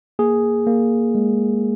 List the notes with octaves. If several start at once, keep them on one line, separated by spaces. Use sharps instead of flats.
A#3 G#4
A#3
G#3